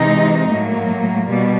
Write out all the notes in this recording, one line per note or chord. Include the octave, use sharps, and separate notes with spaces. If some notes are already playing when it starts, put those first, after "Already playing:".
Already playing: C3 E3 G#3 C4 D#4
A2 F#3 A#3
B2 G3